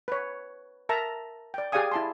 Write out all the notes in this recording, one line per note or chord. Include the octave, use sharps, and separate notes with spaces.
B4 C#5
A#4 E5 A5 A#5
D5 G5
G4 G#4 D5 F5 G#5 D#6
E4 A5 C6